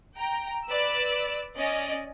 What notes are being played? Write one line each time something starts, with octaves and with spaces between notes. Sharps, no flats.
G5 A#5
B4 D5 E6
C#4 D5 D#5